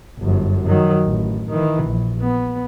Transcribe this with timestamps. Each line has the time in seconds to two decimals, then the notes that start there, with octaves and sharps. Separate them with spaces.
0.18 G1 F#2
0.67 D#3 F#3
1.04 A1
1.50 D#3 E3
1.84 A#1
2.21 B3